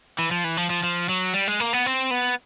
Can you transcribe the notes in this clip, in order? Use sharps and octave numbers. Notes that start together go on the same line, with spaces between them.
E3
F3
E3
F3
F3
F3
F#3
G3
G#3
A#3
B3
C4
B3